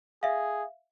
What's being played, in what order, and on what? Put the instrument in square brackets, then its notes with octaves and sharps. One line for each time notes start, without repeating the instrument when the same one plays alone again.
[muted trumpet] G#4 [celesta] E5 F5